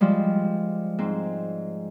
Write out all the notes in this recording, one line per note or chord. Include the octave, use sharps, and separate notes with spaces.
F3 G3 G#3
G#2 C4